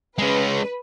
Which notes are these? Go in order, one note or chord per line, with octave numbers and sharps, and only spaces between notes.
G#3 C#4 B4